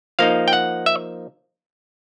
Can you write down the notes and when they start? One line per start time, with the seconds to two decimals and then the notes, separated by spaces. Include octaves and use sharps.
0.19 F3 A#3 D#4 F5
0.48 G5
0.53 F#5
0.86 E5